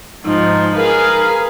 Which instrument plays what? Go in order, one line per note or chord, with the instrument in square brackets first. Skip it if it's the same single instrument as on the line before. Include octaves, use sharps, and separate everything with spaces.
[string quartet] G#2 F3 [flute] D#4
[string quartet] G#4 B4 F5 [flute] A#4